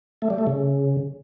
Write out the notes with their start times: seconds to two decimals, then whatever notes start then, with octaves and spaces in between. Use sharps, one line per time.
0.22 A3
0.30 G3
0.38 A3
0.47 C#3